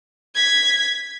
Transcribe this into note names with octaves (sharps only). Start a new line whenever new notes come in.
G#6 B6